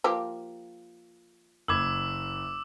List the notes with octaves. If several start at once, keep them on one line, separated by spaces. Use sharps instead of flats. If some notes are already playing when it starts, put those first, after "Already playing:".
F3 A#3 G4
F#1 B5 D6 E6 G#6